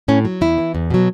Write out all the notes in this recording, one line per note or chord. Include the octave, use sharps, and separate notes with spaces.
A2 C#4
F#3
E2 E4
E3
E2
B2 F#3